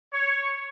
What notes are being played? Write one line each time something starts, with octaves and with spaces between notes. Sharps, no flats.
C#5